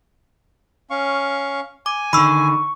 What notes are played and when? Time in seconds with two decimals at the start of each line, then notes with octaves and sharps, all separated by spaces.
0.90 C#4 F5 C#6
1.86 G#5 D6
2.13 D3 D#3 B5 C#6 E6